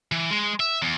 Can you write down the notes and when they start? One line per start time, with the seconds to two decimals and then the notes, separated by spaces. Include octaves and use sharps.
0.12 E3
0.31 G#3
0.60 E5
0.82 E2